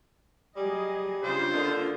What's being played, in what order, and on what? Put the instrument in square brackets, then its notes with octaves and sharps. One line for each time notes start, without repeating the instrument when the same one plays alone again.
[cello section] F#3 G#4 D#5 [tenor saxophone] G3
[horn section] C#3 [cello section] C4 D4 F4 [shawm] C5
[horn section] D3 A#3 D#4